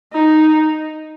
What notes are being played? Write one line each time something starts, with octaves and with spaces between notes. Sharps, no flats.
D#4